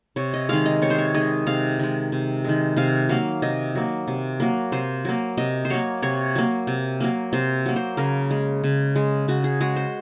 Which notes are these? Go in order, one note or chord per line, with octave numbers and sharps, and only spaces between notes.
C3 C#5
D#5
D#3 G#3 F5
D#5
C3 C#5
C5
C#5
D#3 G#3 D#5
C3 F5
D#3 G#3
C3
D#3 G#3
C3 F5
F#3 A#3 F5
C3 D#5
F#3 A#3
C3
F#3 A#3
C3 C5
F#3 A#3
C3 D#5
C5
F#3 A#3 C#5
C3 C#5
F#3 A#3
C3
F#3 A#3
C3 C5
F#3 A#3
C5
C#3 A#4
G#3
C#3
G#3
C#3 F#4
G#4
G#3 F#4
C5